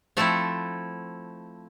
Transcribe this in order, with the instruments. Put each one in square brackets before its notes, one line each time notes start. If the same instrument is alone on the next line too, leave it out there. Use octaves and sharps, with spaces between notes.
[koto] F3 A3 C4 E4 A4